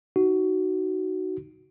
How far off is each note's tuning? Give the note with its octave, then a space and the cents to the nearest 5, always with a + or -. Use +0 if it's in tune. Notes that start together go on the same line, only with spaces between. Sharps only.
D#4 +0 F#4 +15